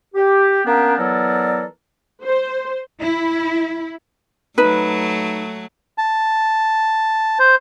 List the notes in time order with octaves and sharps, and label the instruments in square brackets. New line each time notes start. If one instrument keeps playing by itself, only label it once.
[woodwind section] G4
A#3 B3 C#4 D4 G4 A#4
E3 F#3 B3 A4 A#4 D5
[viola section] C5
[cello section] E4
[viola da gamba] F#3 A3 [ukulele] D#4 B4
[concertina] A5
C5